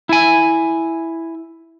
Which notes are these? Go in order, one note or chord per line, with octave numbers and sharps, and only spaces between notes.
E4 G#5